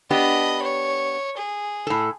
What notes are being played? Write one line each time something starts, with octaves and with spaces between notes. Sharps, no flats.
B3 D4 G4 D#5 B5
C#5
G#4
A2 A4